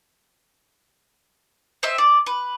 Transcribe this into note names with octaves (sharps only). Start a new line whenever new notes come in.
C4 D#5 E5
D5
B4